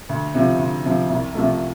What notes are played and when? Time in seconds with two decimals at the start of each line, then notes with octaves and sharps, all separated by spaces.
0.09 D2
0.35 C3 F3
0.59 D2
0.85 C3 F3
1.10 C2
1.35 C3 F3 A3